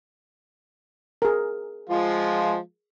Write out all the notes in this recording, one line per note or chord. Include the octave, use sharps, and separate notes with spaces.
G#4 A#4
F3 G#3 F4